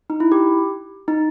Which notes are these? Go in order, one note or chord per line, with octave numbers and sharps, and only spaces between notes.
D#4
E4
G4
D#4